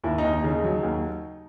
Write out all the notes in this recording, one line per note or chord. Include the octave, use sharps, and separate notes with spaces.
D#2 E4
D#2 D#4
D#4
C#3 D#4
F#3
D#2